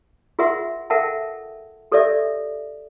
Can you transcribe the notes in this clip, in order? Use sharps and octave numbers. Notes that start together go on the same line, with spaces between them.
F4 G#4 A#4 E5 F#5 C6
A4 A#4 E5 F#5 G5 A5
G4 A4 A#4 C#5 D5 E5